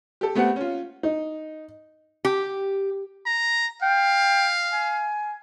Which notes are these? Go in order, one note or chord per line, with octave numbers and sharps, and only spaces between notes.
G4 A4
A3 B3 C4 G4 F#5
C#4 F4
D#4
G4
A#5
F5 G5
G#5